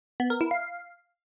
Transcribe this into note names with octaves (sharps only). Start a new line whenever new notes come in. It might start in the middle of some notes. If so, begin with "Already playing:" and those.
B3
A#4
E4
F5